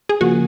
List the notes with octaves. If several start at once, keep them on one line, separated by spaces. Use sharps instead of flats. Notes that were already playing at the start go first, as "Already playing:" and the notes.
G#4
C#3 F3 A#3 F#4